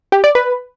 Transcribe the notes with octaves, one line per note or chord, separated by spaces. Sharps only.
G4
D5
B4